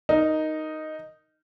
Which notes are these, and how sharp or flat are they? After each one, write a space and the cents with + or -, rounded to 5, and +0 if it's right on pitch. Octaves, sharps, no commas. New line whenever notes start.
D#4 +0 A#4 -5